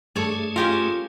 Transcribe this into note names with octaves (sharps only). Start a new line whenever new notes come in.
G2 A3 G#4 A4 C#5 D5
C#4 F4 G4 A#4